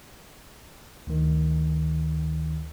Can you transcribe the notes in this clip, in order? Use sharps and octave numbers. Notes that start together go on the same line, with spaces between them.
D2 D#3